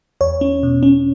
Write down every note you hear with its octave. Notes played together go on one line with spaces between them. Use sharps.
E2 C#5
C#4
B2
C#4